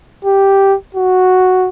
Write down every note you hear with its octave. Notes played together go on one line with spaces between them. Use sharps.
G4
F#4